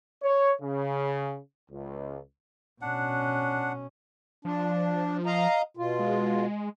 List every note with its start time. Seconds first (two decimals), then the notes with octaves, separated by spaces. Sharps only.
0.23 C#5
0.61 C#3
1.71 C#2
2.82 B2 C#4 D4 F#5
4.45 F3 D4
5.26 D#5 F5 A#5
5.77 B2 F4
5.99 G#3